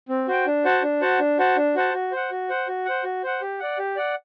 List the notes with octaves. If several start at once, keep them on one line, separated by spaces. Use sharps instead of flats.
C4
F#4 C5 G5
D4
F#4 C5 F#5 A5
D4
F#4 C5 F#5 A5
D4
F#4 C5 F#5 A5
D4
F#4 C5 F#5 A5
F#4
C5 F#5
F#4
C5 F#5
F#4
C5 F#5
F#4
C5 F#5
G4
D5 F#5
G4
D5 F#5